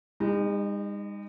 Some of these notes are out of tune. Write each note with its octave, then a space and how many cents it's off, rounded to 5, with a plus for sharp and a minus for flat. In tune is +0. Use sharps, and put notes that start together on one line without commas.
G#3 -45 D#4 +0